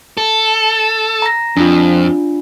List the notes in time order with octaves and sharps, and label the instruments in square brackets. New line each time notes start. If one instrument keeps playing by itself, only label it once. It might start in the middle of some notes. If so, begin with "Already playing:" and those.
[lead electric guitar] A4
[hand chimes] A#5 A#6
[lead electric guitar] F2 [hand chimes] D4 F4